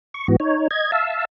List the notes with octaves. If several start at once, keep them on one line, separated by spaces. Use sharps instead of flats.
C#6
G#2 E3 B3 F#4
D#4 C#5
D#5 G#6
E5 F5 A5 E6